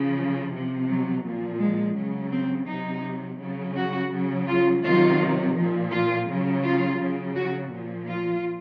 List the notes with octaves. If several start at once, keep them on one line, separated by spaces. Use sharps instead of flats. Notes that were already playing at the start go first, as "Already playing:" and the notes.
Already playing: C#3 F3
C3 F3
F#3
A#2 F3
G#3
C#3 F#3
C4
C3 F#3 D#4
C#3 F#3
F#4
C#3 F#3
F4
C3 D#3 F#3 F4
A#2 F3
F4
C#3 F#3
F4
C#3 F#3
F#4
A#2 F3
F4